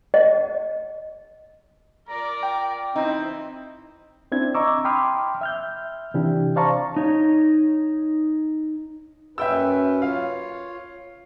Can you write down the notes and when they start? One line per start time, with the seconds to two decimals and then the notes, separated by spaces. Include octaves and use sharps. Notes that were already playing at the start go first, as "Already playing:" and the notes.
0.14 D#5
2.08 F4 A#4 D5 A#5
2.43 G5
2.96 E3 C4 D#4 E4
4.32 C4 D4 E4 G#6
4.54 D#5 A#5 C#6 D6 E6
4.85 G5 B5 C6 D6 D#6 F6
5.41 E5 F6 G6
6.14 C3 E3 D4 E4 G4
6.56 C5 D5 F5 A5 A#5 C#6
6.97 D#4 C#5
9.38 F#2 C#4 B4 E5 G5 E6
10.02 F4 C#5 F5